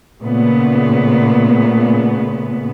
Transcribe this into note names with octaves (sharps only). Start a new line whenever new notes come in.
A#2 C#3 A3 B3